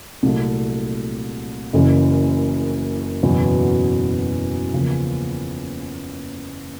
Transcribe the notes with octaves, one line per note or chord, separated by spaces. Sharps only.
C2 A#2 F#3 A3
F#1 F#2 C#3 E3
F#1 E2 B2 F#3 B3
E2 C#3 F3 A#3